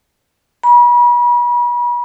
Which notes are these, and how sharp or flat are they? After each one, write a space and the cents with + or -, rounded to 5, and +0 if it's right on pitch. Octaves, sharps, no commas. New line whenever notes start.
B5 -40